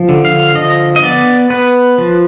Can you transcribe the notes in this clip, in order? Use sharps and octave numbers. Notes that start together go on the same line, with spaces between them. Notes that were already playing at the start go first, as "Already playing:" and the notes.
Already playing: F3
D3
F5
F3 D#5
D#5
B3 D5
B3 B4
F3